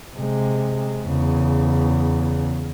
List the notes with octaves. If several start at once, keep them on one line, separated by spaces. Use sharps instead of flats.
C3 G#3
E2 C#3